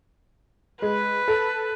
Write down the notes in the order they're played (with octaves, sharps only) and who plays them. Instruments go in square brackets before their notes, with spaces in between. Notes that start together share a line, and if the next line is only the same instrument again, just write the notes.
[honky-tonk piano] G#3 [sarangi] B4
[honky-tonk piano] A4